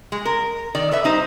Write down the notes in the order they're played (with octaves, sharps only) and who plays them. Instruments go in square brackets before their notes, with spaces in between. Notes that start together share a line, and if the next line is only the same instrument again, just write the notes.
[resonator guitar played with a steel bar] G#3
A#4
D#3 D5
A4 B4 E5
G3 D#4 C5